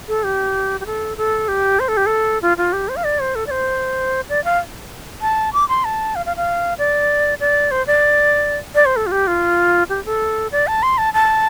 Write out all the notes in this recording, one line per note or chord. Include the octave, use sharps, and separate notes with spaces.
A4
G4
G4
A4
A4
G4
C5
A4
G4
A4
F4
F4
G4
C5
F5
D5
C5
A4
D5
C5
D5
F5
A5
D6
C6
A5
F5
F5
F5
D5
D5
C5
D5
D5
C5
A4
F4
G4
F4
G4
A4
D5
A5
C6
A5
A5